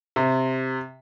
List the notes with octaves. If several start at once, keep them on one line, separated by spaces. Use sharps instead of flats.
C3